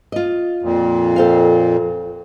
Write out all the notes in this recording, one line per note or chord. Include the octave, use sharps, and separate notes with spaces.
F4 D#5
F2 A#2
A4 C5 F5